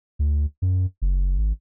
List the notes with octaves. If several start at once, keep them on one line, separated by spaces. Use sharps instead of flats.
D2
F#2
F#1
G#1